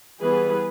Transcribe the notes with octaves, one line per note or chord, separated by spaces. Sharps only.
E3 G3 B3 G#4 B4